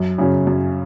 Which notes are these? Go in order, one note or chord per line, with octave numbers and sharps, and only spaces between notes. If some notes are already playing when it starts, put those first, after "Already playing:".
Already playing: F#2
C#3 F#3 C#4
F#2